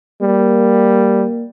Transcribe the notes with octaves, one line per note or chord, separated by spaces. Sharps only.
G3 A#3